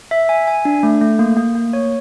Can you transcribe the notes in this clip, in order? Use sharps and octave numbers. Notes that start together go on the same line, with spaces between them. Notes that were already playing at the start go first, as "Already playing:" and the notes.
E5
G#5
G#5
D4
A3
A3
A#3
A#3
A#3
C#5